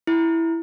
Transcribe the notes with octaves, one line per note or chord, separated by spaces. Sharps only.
E4